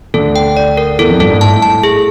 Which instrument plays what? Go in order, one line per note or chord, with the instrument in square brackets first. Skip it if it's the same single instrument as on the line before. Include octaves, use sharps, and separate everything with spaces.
[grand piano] D2 D3 [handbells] A4
[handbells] G5
D5
A#4
[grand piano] E2 E3 [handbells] A4
[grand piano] F2 F3
[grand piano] G2 G3 [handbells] A4
[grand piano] G#2 G#3
[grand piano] A2 A3 [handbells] A5
[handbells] A5
G#4